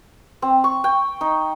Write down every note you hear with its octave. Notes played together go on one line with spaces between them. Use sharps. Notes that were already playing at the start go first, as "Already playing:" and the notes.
C4
C#6
G5
D#4